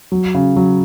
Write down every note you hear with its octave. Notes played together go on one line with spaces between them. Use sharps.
F#3
C#3
F#3